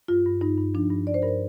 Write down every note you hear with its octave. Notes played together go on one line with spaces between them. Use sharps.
G2 F4
G2
G2 D#4
G2
F3 D4
G2
G2 D5
C5
G2 A#4
C5